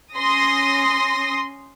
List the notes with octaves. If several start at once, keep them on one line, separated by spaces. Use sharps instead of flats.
C#4 C6 D#6 A#6